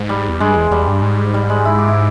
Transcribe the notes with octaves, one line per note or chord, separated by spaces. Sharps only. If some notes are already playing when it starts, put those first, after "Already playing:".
Already playing: G#2
G3
E2
G2 G#3
E2
E2 G3
G2
G#2
G3
G#3
E4
G4
E4